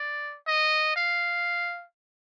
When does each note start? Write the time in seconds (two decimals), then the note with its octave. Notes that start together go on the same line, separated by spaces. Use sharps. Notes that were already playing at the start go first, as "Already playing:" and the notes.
Already playing: D5
0.47 D#5
0.96 F5